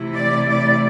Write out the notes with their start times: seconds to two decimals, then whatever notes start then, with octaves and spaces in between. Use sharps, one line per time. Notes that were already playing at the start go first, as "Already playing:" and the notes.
Already playing: C3 E3 A3 E4
0.15 D5
0.49 D5